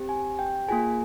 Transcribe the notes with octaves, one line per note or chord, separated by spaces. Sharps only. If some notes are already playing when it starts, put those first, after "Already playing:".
Already playing: C4 G4
G#5
G5
A#3 F4 G#4 G#5